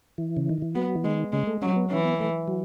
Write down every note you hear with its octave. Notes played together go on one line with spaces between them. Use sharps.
E3
C#3
D#3
E3
F#3 B3
E3
D#3 G#3
C#3 G#3
A3
F#3 C#4
B3
E3 C#4
B3
A3
F#3